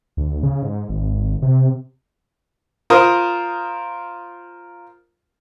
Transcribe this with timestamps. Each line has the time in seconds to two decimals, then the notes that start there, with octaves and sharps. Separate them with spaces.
0.17 D2
0.43 C#3
0.63 G#2
0.89 G#1
1.42 C3
2.90 F4 A#4 C5 D#6